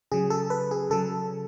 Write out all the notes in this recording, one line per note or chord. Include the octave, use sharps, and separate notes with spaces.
C#3 F#3 G#4
A4
B4
G#4
C#3 F#3 A4